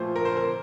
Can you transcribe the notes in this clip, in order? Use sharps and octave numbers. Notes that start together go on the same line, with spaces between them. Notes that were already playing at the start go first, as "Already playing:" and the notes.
Already playing: A#2 F3 A3 C5
A#4
C5
A#4